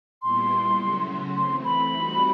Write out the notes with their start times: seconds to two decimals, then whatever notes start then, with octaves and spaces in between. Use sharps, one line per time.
0.22 A#2 G3 B3 E4 C6
0.79 C#3 F#3 A3 C#4 F#4
1.36 E3 A3 C4 C6
1.64 B5
1.93 G3 C4 D#4 F#4